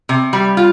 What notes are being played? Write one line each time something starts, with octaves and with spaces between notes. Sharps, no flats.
C3
G3
F4